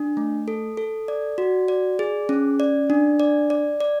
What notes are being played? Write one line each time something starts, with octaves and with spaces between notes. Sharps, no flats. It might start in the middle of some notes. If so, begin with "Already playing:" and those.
Already playing: D4
A3
A4
A4
D5
F#4
D5
G#4
C#4
D5
D4
D5
D5
D5